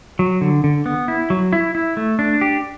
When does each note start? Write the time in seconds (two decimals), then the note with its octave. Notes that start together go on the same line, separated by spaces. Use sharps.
0.19 F#3
0.41 D3
0.64 D3
0.86 B3
1.08 E4
1.30 F#3
1.53 E4
1.75 E4
1.97 A3
2.19 D4
2.41 G4